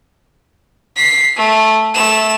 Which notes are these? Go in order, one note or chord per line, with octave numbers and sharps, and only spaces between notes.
B6 C7
A3
A3 E7